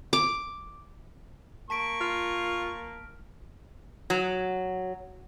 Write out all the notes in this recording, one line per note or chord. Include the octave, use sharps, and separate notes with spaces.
D6
A#3 A5 C#6 B6 D7
F4 F6
F#3